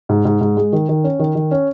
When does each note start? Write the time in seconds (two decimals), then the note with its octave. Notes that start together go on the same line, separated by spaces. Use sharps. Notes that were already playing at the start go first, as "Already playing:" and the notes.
0.09 G#2
0.25 G#2
0.41 G#2
0.57 G#3
0.73 D#3
0.89 D#3
1.04 C#4
1.19 D#3
1.35 D#3
1.51 C#4